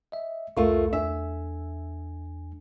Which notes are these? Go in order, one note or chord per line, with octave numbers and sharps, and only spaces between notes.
D#5 E5
C2 F2 A3 F4 A#4 C#6
E2 D4 E5 G#5